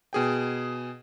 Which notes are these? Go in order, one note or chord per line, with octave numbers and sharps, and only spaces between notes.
B2 G#4 G5